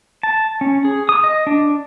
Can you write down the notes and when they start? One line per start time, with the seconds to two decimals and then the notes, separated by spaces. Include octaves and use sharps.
0.23 A5
0.61 C#4
0.85 G#4
1.09 D#6
1.24 D#5
1.47 D4